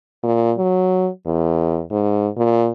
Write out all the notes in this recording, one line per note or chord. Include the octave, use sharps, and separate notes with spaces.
A#2
F#3
E2
G#2
A#2